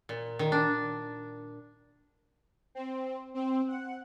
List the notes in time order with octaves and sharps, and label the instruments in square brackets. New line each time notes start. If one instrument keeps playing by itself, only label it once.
[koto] A#2
D#3
D4
[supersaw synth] C4
C4
F#5